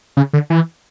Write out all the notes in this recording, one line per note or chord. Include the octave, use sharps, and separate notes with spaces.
C#3
D3
E3